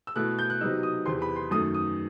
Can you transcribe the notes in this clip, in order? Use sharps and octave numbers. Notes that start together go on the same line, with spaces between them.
E6
B2 A3 E4 F#6
G6
F#6
C3 F#3 B3 D#4 E6
D#6
E2 C3 E3 C6
B5
C6
F#2 D#3 A3 D#6
D#6